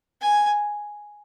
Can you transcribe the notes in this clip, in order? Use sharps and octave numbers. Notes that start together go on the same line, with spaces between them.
G#5